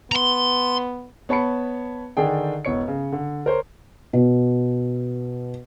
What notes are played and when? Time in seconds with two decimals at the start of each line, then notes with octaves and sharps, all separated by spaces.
0.12 B3 A#5 C6
1.29 B3 C#5 A5 B5 C#7
2.17 D3 D#3 D4 G#4 G5
2.65 E1 B3 C#5 C#7
2.88 C#3
3.12 D3
3.46 A#4 C5 C#5
4.13 B2